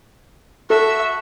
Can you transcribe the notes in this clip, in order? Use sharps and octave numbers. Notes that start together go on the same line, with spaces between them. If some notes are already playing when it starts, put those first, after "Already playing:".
F#4 A4 E5